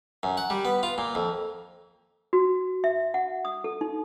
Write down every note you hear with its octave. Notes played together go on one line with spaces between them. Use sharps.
F#2
F#5
G3
B3
F4
A#2
F2
F#4
E5
F#5
D#6
A4
D#4